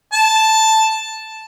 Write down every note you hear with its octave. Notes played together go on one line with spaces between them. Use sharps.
A5